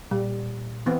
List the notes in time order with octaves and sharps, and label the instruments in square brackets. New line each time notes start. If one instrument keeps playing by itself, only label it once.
[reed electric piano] A#2 [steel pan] G3
[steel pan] E3 B3 C4